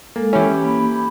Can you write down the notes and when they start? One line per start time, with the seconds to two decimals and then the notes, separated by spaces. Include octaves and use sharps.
0.16 G#3 A#3 A4
0.33 E3 C#4 E4 G4
0.62 A#3 B5
0.96 B5